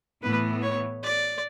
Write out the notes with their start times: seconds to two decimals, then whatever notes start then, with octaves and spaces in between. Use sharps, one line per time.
0.22 A2 E3 B3 B4
0.62 C#5
1.03 D5